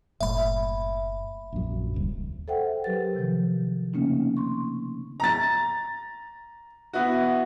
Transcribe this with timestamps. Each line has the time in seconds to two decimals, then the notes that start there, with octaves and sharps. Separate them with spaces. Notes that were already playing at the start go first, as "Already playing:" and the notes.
0.21 F#1 A2 E5 B5
1.52 A#1 F#2
1.94 D#1 C#2
2.48 A4 C5 E5 F#5 G5
2.84 F#3 G4 A#4 B4 A6
3.14 C3 D#3 F3
3.93 C#3 A3 A#3 C4 C#4 D#4
4.37 C6 C#6
5.20 A#5 A6
6.93 B3 E4 F#4